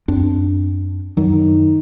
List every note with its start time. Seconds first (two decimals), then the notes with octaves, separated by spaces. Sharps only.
0.08 F#2 C4 D4
1.17 F#2 D#3 F#3